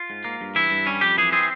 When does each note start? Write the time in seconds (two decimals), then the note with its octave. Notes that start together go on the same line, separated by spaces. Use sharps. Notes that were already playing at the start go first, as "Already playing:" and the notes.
Already playing: F4
0.10 G#2
0.25 A#3
0.41 G2
0.55 E3 E4
0.71 G2
0.86 G3 C#4
1.01 F2 G4
1.17 E3 G#4
1.32 C4 G#4